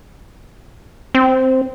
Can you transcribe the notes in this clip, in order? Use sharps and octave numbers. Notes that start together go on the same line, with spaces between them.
C4